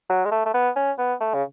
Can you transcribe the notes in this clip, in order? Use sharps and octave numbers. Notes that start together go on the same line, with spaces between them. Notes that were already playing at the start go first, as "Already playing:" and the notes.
F#3
G#3
A3
A3
B3
C#4
B3
A3
C#3